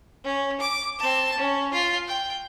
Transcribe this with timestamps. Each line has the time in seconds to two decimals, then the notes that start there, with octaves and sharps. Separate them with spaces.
0.24 C#4
0.60 D6
0.98 C4 A5
1.37 C#4
1.73 F4 F5
2.07 G5